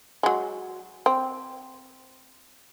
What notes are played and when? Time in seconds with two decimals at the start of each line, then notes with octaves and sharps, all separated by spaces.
0.23 F#3 G#3
1.06 C4